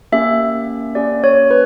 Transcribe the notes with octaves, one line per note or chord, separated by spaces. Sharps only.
A#3 C#4 G4 E5
A#3 C#4 G4 D5
C#5
B4